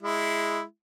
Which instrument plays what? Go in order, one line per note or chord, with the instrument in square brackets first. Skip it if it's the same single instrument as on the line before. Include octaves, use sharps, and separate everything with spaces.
[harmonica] G#3 E4